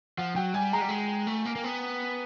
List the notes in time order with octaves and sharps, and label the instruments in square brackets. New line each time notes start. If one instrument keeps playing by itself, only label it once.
[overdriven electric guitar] F3 [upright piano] F#5
[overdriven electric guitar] F#3 [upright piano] G5
[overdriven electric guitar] G3 [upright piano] G#5
[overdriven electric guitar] G#3 [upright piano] A#5
[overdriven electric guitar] G3
G#3
A3
A#3
A#3
B3